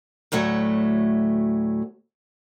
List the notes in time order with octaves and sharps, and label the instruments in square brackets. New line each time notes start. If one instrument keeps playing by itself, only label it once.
[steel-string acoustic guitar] D2 A2 F#3 A3